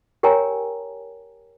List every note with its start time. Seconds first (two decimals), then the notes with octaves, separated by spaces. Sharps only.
0.23 G4 A#4 C#5 G5 G#5 A#5